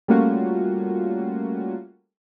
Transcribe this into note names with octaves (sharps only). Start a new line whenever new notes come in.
G3 A3 A#3 C#4 F4 F#4